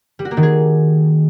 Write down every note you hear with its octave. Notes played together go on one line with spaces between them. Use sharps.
G3
F#4
A#3
D#3
G#4